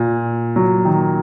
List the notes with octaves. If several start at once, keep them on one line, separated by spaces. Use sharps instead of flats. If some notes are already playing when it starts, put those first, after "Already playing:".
Already playing: A#2
F#3
D#3